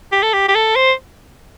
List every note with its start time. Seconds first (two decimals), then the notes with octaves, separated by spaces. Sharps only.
0.12 G4
0.23 A4
0.34 G4
0.48 G4
0.55 A4
0.76 C5